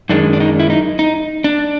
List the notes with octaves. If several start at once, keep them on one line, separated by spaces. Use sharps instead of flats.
F#2 D#3 G#3 D4
D4
D#4
E4
D#4
D#4
D4